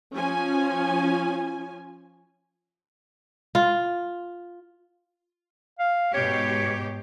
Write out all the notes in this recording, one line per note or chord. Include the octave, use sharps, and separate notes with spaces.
F3 C#4 G#5
F4
F5
G#2 B2 G4 C#5